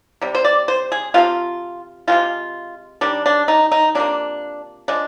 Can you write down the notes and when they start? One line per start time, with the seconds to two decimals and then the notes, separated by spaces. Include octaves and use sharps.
0.21 C3 G3
0.35 C5
0.45 D5
0.68 C5
0.92 G#4
1.14 C3 F3 C4 F4
2.07 D#3 G#3 F4
2.12 C3
3.01 D#3 G3 D4
3.26 D4
3.48 D#4
3.72 D#4
3.95 C3 F3 A#3 D4
4.88 F3 G#3 D4